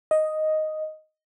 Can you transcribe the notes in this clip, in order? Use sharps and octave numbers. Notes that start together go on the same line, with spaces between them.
D#5